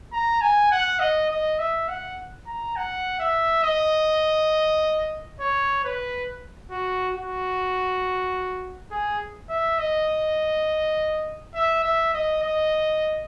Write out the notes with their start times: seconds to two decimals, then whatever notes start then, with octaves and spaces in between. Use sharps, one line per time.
0.13 A#5
0.41 G#5
0.71 F#5
0.99 D#5
1.30 D#5
1.59 E5
1.88 F#5
2.47 A#5
2.76 F#5
3.19 E5
3.63 D#5
5.40 C#5
5.84 B4
6.71 F#4
7.16 F#4
8.91 G#4
9.50 E5
9.79 D#5
11.54 E5
11.83 E5
12.14 D#5
12.42 D#5